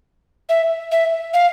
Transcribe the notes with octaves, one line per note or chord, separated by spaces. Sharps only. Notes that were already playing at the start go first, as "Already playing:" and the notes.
E5
E5
F5